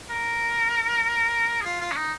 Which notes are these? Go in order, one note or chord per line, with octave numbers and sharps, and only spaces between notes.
A#4
G#4
F4
F4
C#4
D#4